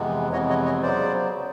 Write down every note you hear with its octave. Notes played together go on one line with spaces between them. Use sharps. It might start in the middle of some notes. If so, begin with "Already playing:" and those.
Already playing: F2 C3 E3 G#3 B3
F2 C3 E3 G#3 B3 C#5 D#5
C#5 D#5
C#5 D#5
C#3 F#3 B3 C5 D5